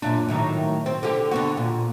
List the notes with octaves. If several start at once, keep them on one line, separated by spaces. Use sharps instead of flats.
F#2 A#2 D4
A2 D#3 F#3
C4
D3 G4
D3 B3 F#4
A#2